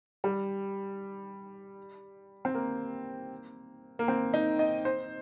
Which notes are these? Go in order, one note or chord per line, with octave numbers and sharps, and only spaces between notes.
G3
C4
A#3
A#3
C4
D#4
D#5
C5